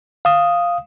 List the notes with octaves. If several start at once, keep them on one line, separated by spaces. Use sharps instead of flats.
F5 D#6